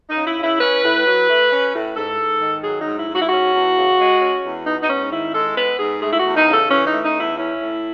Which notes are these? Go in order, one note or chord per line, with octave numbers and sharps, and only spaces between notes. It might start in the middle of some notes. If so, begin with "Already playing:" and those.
D#4
C#3
E4
C#3 E4
C#4 B4
A2
F#3
A3
C#4
A2
G#2 A4
G#2
D#3
F#3 G#4
D#4
G#2
E4
G#2
F#4
E4
C#4 F#4
E2
C#3
G#3
C#4
E2
B3 D#4
D#4
G#2 C#4
D#3 E4
G#3 A4
B3 B4
G#2 G#4
A3 G#4
E4
F#4
E2
D#4
C#3
A4
E3 C#4
D#4
A3
D#4
E2
E4
C#4 E4
A2